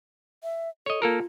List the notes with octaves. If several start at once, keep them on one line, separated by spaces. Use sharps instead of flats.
E5
A4 C#5 D#5
A#3 F4 A4 A#4